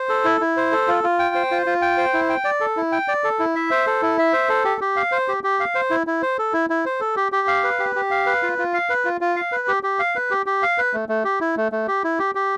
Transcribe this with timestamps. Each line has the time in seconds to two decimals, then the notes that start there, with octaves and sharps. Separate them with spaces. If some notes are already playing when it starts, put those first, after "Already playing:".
Already playing: C5
0.09 A4
0.25 E4
0.41 E4
0.57 C5
0.72 A4
0.88 F4
1.04 F4
1.19 G5
1.35 C5
1.51 F4
1.66 F4
1.82 G5
1.98 C5
2.14 E4
2.29 G5
2.45 D5
2.60 A4
2.77 E4
2.92 G5
3.08 D5
3.24 A4
3.39 E4
3.55 E5
3.71 C5
3.87 A4
4.02 E4
4.18 E5
4.33 C5
4.49 A4
4.65 G4
4.81 G4
4.96 F5
5.12 C5
5.28 G4
5.44 G4
5.60 F5
5.75 C5
5.90 E4
6.07 E4
6.22 C5
6.39 A4
6.53 E4
6.70 E4
6.86 C5
7.00 A4
7.16 G4
7.32 G4
7.48 F5
7.64 B4
7.79 G4
7.96 G4
8.11 F5
8.26 B4
8.43 F4
8.58 F4
8.74 F5
8.90 B4
9.05 F4
9.21 F4
9.36 F5
9.52 B4
9.68 G4
9.83 G4
9.99 F5
10.15 B4
10.31 G4
10.46 G4
10.62 F5
10.78 B4
10.94 A3
11.09 A3
11.24 G4
11.41 E4
11.57 A3
11.72 A3
11.88 G4
12.04 E4
12.19 G4
12.35 G4